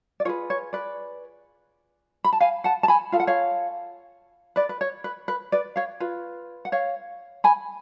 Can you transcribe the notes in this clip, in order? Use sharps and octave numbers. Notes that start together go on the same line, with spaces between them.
D5
F4 G#4 B4 C#5
C#5
B4 D5
B5
A5
F5 G#5
F#5 A5
A5
G#5 B5
F4 A4 F5
F#5
C#5 F5
B4 D5
B4
C#5
B4
B4
B4 D5
C#5 F5
F4 B4
F#5
C#5 F5
G#5 B5